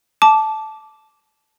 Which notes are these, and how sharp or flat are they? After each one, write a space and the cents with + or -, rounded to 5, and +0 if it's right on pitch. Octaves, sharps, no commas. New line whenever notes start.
A5 -15 D6 -5